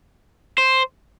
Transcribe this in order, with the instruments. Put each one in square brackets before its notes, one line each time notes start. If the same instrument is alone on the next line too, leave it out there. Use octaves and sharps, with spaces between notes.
[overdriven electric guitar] C5